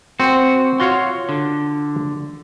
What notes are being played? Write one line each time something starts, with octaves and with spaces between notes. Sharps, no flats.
C4 F#4
F4 F#4 C#5 F5 C6
D3